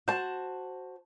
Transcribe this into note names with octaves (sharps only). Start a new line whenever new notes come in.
F#4 C5 A5